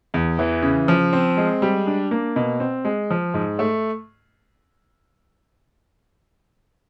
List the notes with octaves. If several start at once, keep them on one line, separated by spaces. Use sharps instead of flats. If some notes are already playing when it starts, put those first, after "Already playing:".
E2
E3
C#3
F3
C4
G#3
G3
D4
A#3
B2
C4
G#3
F3
G#2
A3